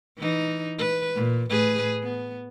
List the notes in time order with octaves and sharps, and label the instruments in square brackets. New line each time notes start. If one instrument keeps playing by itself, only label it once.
[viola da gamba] E3 D#4
B4
A#2
A2 G#4 B4
B3